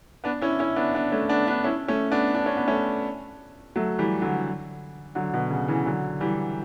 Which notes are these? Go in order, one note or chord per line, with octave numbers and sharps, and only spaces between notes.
B3 D4
C#4 E4
C#4 E4
B3 D4
B3 D4
A3 C#4
B3 D4
B3 D4
C#4 E4
A3 C#4
B3 D4
D4
C#4
B3
A3 C#4
F#3 A3
E3 G3
D3 F#3
D3 F#3
B2
C#3
C#3 E3
D3 F#3
E3 G3